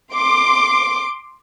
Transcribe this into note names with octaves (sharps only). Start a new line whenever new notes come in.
C6 D6